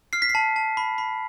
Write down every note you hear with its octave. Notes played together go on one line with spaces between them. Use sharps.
F6 C7
B6
C7
A5
A5
B5
B5